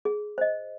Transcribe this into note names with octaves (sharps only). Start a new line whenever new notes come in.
G#4
C5 D#5